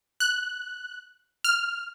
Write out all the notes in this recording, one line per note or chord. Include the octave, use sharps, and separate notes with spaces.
F#6
F6